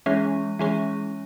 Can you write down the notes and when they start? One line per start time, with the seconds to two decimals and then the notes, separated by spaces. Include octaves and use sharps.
0.06 E3 G#3 C#4
0.59 E3 G#3 C#4